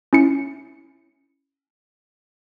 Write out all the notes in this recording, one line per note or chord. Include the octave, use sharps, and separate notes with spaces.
C#4 E4 C#7